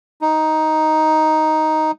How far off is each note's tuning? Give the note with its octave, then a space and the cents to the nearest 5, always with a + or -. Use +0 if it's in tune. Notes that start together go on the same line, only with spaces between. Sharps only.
D#4 +5